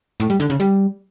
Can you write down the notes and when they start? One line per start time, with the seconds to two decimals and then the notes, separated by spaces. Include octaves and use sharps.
0.20 A2
0.30 G3
0.40 D3
0.50 C#3
0.60 G3